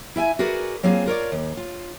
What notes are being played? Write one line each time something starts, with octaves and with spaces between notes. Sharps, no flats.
E4 E5 G5 G#5
F#4 G#4 A#4 B4 D5
F#3 A#3 C4 F4 G#4
F4 A#4 C#5 D5
D#2
F4